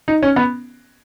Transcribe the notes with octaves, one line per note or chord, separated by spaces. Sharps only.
D#4
C#4
B3